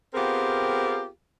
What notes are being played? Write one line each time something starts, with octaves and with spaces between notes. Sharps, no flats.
B3 C4 F4 G4 G#4 A#4